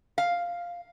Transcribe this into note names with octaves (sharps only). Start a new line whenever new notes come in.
F5